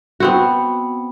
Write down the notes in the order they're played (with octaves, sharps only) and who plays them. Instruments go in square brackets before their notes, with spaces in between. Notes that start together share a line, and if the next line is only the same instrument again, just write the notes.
[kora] B3 C4 F#4